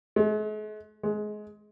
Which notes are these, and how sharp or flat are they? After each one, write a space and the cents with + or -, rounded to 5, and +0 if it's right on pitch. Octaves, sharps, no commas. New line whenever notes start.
G#3 +45
G#3 +20